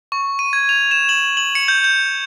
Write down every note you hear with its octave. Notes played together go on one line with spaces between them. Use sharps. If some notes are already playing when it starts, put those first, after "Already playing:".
C#6
D#7
G#6
F7
E7
F#7
F#7
C#7
G6
G6